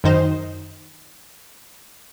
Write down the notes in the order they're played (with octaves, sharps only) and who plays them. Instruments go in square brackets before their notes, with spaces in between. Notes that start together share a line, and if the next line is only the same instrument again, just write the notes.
[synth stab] F#2 D#3 D#4 C5